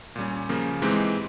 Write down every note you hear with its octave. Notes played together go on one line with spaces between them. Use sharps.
A#2 G3 C#4
C#3 F3 A#3 C#4
G#2 E3 G#3 C4 G4